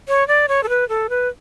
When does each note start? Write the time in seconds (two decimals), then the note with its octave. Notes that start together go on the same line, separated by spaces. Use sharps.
0.08 C#5
0.28 D5
0.48 C#5
0.63 A4
0.69 B4
0.89 A4
1.10 B4